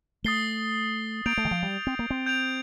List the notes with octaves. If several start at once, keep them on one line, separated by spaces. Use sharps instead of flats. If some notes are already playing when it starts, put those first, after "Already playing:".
A3 D#6 A6 C7 G7
A#3 G6 D7 F7
A3
D#3
F3
G3
C4
A#3
C4
G6 D7 F7